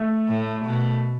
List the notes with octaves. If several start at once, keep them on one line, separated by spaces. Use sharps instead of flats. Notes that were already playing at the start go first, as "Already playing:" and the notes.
Already playing: A3
A2
B2